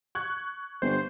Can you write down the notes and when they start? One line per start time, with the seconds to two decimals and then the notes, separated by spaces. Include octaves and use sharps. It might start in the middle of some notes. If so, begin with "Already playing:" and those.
0.15 C#6 F#6 G#6
0.82 G1 C5